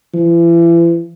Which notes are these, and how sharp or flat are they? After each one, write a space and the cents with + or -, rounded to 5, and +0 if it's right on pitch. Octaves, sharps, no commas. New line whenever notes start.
E3 +40